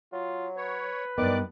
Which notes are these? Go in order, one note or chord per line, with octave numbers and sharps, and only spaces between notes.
F#3 F4
B4 C#5
G2 D#3 B3 D5 D6 F#6